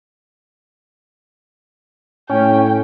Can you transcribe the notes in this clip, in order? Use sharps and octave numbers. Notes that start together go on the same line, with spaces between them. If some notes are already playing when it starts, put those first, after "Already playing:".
A2 C#4 G5